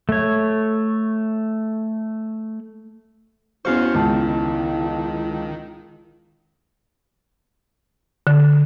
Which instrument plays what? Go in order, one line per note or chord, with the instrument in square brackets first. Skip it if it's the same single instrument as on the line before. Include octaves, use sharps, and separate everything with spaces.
[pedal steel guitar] A3 C#5
[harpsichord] E2 F5 C#6 [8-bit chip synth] C#4 F#4 C5 [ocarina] E4
[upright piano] C#2 A5 [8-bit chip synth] D#3
[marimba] D3